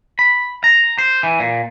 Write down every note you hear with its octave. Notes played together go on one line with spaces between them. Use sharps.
B5
A#5
C5
E3
A#2